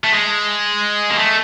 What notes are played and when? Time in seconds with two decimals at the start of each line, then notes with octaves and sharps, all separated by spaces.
0.04 A3
0.12 G#3
1.10 A#3
1.18 A3